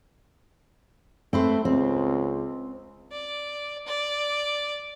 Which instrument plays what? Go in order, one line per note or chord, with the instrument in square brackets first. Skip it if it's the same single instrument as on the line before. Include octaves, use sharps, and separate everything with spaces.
[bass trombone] A3 [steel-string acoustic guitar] C4 B4 C5
[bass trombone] C#2 [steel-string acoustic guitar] C4
[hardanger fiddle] D5
D5